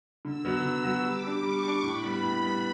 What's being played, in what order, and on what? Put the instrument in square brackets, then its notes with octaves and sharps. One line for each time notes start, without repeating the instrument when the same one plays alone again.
[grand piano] D3 [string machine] E6
[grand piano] F#3 B3 F#4
[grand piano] D3 [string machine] E6
[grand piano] F#3 B3 F#4
[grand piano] G3 [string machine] D6
[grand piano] D4 G4
[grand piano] G3 [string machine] C#6
[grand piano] D4 G4
[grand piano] A2 [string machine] B5
[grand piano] G3 B3
[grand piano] A2 [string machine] B5
[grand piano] G3 B3